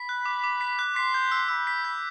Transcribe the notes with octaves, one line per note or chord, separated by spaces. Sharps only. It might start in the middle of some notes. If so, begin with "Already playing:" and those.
Already playing: B5 B6
F#6
D6
D6
B6
F#6
C6 B6
G6
E6
B5 E6
B6
G6